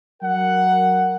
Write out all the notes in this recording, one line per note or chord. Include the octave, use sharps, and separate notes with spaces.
F#3 A#4 F#5